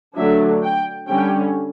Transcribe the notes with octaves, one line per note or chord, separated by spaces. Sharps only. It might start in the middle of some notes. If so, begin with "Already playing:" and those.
D3 F#3 A3 D4 E5
G5
D3 G3 C#4 G5